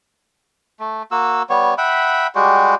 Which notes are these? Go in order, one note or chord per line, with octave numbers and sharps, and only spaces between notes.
A3
A#3 F#4 E6
G3 B3 C#5
E5 F#5 G5 B5
G3 G#3 F#4 G4